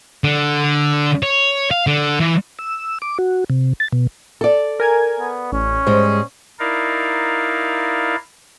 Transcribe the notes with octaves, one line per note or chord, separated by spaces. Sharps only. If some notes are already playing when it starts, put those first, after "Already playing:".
D3
C#5
F5
D3
E3
E6
D6
F#4
C3
A6
B2
A4 D5
A#4 G#5 G#6
B3
A1 C#4
G#2 G3 G#3 C5
D#4 E4 A#4 D5 F5